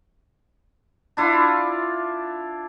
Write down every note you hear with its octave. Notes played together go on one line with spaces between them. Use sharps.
D4 E4 F4